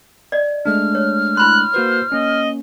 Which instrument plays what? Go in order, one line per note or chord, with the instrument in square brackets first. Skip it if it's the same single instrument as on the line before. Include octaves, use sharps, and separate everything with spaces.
[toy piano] D5 D#5
[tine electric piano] G#3 A3 D4 [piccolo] F6
[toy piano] C#5
[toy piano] E4 B5 C6 [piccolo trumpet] F#6
[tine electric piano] A#3 F#4 B4 [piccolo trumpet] C5
[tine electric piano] A#3 C#4 [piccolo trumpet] D#5